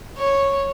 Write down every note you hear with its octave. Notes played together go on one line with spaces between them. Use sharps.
C#5